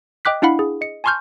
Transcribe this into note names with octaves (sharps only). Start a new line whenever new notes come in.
D#5 G5 D6 F#6 B6
D4 E4 F5 F#5 B5
G#4
D#5 C#7
G#5 A5 C6 C#6 F6 G6